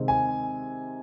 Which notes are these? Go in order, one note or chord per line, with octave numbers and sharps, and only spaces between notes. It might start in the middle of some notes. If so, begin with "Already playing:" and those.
Already playing: C3 D#3 G#3 C4
G#5